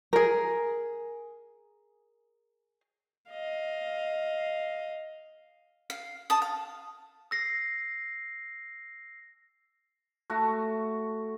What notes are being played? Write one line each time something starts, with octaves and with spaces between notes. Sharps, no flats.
G#4 A#4
D#5 F5
F5
A5 D#6
F5
E6 A#6 C7
A3 F#4